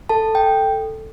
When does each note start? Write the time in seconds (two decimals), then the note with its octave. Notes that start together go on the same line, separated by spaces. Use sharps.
0.09 A4 A5
0.35 G5